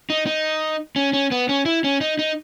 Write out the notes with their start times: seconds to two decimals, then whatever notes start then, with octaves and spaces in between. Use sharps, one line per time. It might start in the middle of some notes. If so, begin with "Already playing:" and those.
0.10 D#4
0.26 D#4
0.96 C#4
1.13 C#4
1.31 B3
1.49 C#4
1.66 E4
1.84 C#4
2.01 D#4
2.19 D#4